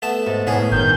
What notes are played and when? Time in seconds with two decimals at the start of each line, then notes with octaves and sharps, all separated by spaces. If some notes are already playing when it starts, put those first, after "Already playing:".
0.02 A3 B3 A5
0.26 G#2
0.47 A2 B3 C#4 G#4
0.72 G1 D#3 G6